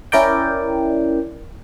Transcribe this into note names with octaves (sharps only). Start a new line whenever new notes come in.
C#4 E4 A#4 D5 G5